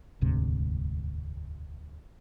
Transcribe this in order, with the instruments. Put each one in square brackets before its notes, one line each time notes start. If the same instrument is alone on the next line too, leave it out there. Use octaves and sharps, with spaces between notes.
[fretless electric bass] E1 D2 G#2 C3